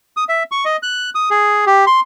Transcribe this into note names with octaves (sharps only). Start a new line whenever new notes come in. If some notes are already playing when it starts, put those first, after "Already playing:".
D#6
E5
C#6
D#5
F#6
D#6
G#4
G4
C6